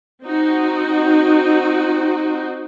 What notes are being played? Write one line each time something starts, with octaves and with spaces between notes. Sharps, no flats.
C4 D#4 F#4